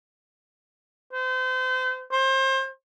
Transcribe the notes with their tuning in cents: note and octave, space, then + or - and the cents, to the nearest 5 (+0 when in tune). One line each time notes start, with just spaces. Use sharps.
C5 -35
C5 +30